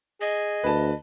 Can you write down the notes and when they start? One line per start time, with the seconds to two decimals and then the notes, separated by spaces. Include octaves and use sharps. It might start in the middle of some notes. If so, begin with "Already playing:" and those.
0.21 G#4 D#5
0.64 D2 B4 A5